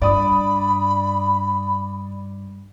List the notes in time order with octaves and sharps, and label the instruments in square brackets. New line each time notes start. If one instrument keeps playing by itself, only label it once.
[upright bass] G2 [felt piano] D5 D#6 [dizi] B5